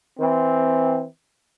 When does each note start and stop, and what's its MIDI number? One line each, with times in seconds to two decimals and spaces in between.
0.19 1.03 52
0.19 1.03 60